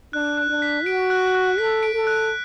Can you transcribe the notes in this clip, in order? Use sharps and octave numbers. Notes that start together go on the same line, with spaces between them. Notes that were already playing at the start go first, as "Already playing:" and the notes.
D4 F#6
F#6
D4
B6
F#4 D7
F#6
F#6
A4 B6
D7
A4
F#6